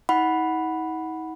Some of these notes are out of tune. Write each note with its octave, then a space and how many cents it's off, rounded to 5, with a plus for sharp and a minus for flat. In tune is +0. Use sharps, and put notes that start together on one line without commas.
D#4 +45 F#5 +0 B5 +0